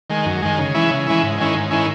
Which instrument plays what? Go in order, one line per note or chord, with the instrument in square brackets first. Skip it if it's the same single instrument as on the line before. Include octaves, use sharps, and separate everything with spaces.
[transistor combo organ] D#3 G#3
F#2
D#3 G#3
C#3
E3 G#3 C#4 E4
C#3
E3 G#3 C#4 E4
G#2
D#3 G#3 C#4 E4
G#2
D#3 G#3 C#4 E4